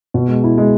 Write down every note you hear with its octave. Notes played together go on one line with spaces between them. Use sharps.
B2
G#3
E4
G#3